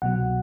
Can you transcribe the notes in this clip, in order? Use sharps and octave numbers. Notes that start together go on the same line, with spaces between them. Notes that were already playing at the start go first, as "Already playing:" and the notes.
C2 B2 F#3 F#5